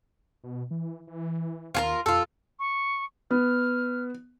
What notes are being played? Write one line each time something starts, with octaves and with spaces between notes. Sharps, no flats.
B2
E3
E3
D#2 F4 G#4 A#4
F2 F4 A4
C#6
B3 F6